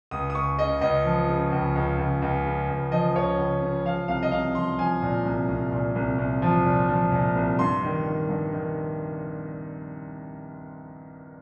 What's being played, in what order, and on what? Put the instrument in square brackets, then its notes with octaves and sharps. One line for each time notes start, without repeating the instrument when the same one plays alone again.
[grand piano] C#2 D#6
D#6
C#2 C#6
C#3 D#5
C#2 D#5
F3
C#3
C#2
C#2
C#2
C#2
C#3
C#2
F3 D#5
C#2 C#5
C#2
C#3
F3 F5
C2 F5
D#5
C2 F5
F3 C6
F3 G#5
A#2
C2
C2
A#2
C2
C2
F3
A#2
F3
A#2
C2
G2 C6
D#3
D#3
G2
D#3